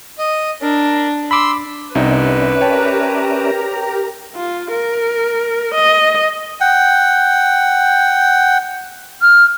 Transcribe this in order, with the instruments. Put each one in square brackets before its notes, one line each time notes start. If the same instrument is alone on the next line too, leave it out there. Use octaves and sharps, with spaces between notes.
[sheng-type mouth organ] D#5
[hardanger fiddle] D4 [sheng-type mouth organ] A#4
[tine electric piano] B5 D6 [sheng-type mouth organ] C6 E6
[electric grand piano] C2 C3 D#4 [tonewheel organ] C#4 D5 E5 [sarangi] B4
[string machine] G4 A#4 A#5 [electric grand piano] C#5 G5 A5
[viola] F4
A#4
D#5
[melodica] F#5 G5
[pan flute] F6